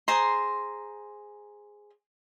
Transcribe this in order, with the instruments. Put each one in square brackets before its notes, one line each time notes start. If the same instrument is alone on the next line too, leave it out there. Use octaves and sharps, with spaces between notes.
[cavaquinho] G#4 C5 A#5 C6